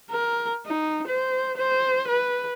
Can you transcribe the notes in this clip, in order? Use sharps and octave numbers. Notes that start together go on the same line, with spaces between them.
A#4
D#4
C5
C5
B4